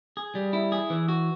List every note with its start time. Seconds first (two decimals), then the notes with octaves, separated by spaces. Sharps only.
0.17 G#4
0.35 G3
0.53 E4
0.72 G#4
0.90 E3
1.08 F#4